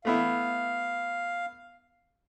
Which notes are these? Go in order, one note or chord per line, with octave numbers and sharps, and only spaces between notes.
A3 B3 E4 F5